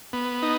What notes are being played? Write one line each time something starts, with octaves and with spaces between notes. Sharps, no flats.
B3
D#4